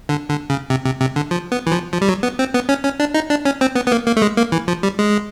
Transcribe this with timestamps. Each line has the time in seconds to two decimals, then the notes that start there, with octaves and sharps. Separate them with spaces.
0.09 D3
0.29 D3
0.50 C#3
0.70 C3
0.86 C3
1.01 C3
1.16 D3
1.31 F3
1.52 B3
1.67 E3
1.72 F3
1.93 F3
2.01 G3
2.08 F#3
2.23 B3
2.39 C4
2.54 B3
2.69 C#4
2.84 C#4
3.00 D4
3.14 D#4
3.30 D4
3.45 C#4
3.61 C4
3.76 B3
3.87 B3
3.92 A#3
4.07 A#3
4.17 A3
4.22 G#3
4.37 A#3
4.52 E3
4.68 F3
4.83 G3
4.99 G#3